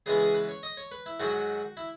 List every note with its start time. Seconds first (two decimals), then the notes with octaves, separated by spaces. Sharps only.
0.06 C#3 E3 G#3 B3 G#4
0.20 G#4
0.34 B4
0.49 C#5
0.63 D#5
0.77 C#5
0.91 B4
1.06 E4
1.20 G#2 D#3 F#3 F#4
1.77 E4